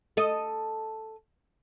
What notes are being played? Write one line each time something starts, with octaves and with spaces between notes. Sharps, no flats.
A4 D#5